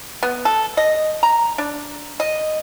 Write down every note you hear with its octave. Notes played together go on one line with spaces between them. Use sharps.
B3
A4
D#5
A#5
D4
D#5